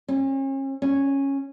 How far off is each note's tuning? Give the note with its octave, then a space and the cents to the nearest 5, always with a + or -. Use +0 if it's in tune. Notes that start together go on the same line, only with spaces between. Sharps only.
C#4 -40
C#4 -10